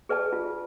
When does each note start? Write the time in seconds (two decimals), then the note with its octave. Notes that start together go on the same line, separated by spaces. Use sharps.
0.09 G#4 B4 D5 A5
0.33 F4